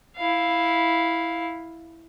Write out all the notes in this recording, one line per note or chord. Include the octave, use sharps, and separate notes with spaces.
E4 F5